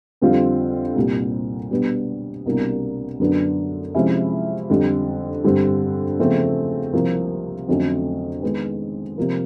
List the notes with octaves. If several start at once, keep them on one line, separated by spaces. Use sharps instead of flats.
F2 D3 G3 C4 F4
C2 A#2 G3
B2 G3 B3 D4
C2 B2 G3 A#3 D4
F#2 D3 F#3 B3 D4
C3 F3 G#3 C#4 E4
F2 D3 G3
G2 D3 G3 C4
E2 C#3 F3 A3 C4
C2 C3 F3 A#3
F2 D3 F#3 A3 C#4
D#3 G#3 B3
C3 F3 A#3